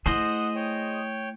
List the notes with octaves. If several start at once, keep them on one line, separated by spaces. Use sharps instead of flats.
A3 E4 G#4 C5 D#5 F#5
C#5 G5